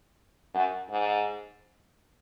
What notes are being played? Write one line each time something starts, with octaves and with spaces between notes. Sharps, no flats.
F#2
G#2